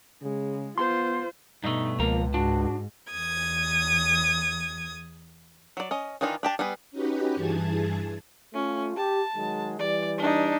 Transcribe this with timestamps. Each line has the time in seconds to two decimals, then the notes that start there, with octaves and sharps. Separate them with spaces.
0.22 C#3 G#3
0.78 B3 F4 C5 C6
1.64 G2 B2 A3 D#4
1.99 C#2 F3 A#3 A#5
2.34 G#2 D4 F#4
3.12 E2 D#6 G#6
5.77 F#3 D5
5.91 C#4 D#5
6.21 D#3 E3 D4 D#4 F4
6.43 D4 G4 A5
6.59 G3 B3 G#4 B4
6.91 C#4 D#4 F#4 G4 B4
7.35 G2 E3 G#4 G#5 A5 G#6
8.54 A3 C#4 F4
8.97 G4 A5
9.36 D#3 F#3 G#3
9.79 E3 G3 D5
10.18 D4 D#4